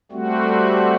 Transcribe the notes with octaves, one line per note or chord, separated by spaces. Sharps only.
G3 A3 C4 F#4